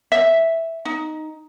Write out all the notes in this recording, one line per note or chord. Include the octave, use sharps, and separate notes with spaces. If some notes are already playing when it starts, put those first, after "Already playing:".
E5
D#4